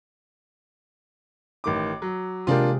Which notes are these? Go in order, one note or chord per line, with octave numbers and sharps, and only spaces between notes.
A1 D#3 D6
F#3
C3 G#3 A#3 D4 F4 G4